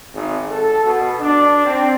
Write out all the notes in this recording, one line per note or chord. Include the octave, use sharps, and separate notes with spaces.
G#1
A4
B2
D4
C4